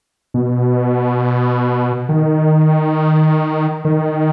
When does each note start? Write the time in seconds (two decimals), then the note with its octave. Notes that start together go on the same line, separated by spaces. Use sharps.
0.34 B2
2.09 D#3
3.85 D#3